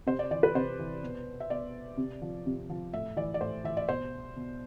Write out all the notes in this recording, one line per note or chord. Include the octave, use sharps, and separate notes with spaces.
C3 C5
D5
E3 D5
B4
C3 C5
E3
B2
E5
B2 D5
C3
F3
C3
F3
A2 E5
E3 D5
D5
A2 C5
E3 E5
D5
B2 C5
B2